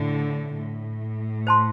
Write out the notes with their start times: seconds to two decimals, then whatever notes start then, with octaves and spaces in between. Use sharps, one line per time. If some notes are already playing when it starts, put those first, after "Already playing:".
Already playing: A2 D3
0.54 A2
1.47 C5 A5 C6